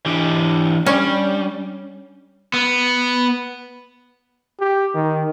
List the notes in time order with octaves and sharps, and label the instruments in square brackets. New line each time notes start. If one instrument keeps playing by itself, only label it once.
[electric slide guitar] E3 G4 [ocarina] D4
[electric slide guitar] G3 [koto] C#4
[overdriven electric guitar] B3
[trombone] G4
D#3